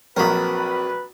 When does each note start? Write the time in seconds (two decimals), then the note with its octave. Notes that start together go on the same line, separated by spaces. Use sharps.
0.17 A#1 F#3 C4 F#4 A#4 B4 B5